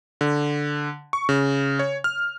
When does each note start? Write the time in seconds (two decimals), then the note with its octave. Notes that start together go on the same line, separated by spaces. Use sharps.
0.21 D3
1.13 C#6
1.29 C#3
1.79 C#5
2.04 F6